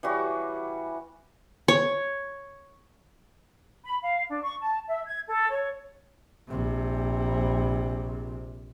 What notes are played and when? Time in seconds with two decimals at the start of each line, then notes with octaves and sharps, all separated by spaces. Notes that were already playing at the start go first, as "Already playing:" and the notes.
0.03 E3 G3 F#4 C#5
1.68 C#5
3.84 B5
4.01 F5
4.30 D4
4.42 C#6
4.60 A5
4.87 E5
5.06 G#6
5.28 A4
5.50 C#5
6.48 A#1 C3